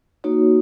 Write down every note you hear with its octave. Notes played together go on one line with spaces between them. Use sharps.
A#3 D#4 F#4 C#5